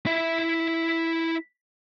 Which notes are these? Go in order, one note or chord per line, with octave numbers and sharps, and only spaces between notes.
E4 E5